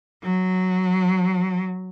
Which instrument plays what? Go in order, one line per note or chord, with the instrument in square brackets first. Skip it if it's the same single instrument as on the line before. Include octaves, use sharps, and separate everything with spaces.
[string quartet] F#3